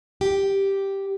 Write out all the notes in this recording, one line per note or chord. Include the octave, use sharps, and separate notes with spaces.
G4